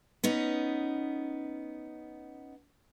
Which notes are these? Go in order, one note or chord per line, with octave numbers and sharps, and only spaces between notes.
B3 C#4 D#4